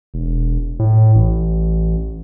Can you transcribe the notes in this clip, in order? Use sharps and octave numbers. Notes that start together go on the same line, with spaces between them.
E1
A2
A1